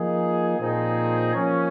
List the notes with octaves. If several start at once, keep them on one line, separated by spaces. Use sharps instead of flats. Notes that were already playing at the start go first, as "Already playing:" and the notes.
Already playing: F3 A#3 D#4 G#4
A#2 F3 C4 D#4 G#4
F3 A#3 C#4